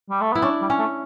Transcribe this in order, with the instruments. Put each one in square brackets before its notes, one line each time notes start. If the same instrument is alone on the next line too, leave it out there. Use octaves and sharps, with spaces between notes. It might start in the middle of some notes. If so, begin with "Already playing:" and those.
[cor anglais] G3
A3
[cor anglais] B3 [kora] E4
[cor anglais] C#4 [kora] D4
[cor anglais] G3
[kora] C#4
[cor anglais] A3